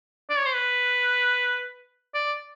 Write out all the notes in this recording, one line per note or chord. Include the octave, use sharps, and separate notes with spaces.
D5
C#5
C5
B4
D5